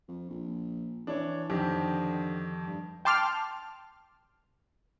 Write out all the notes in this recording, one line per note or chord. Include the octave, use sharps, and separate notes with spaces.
F2
A#1
E3 D4 C#5
F2 D3 D#3 G4
G2
G5 A5 C6 D6 F6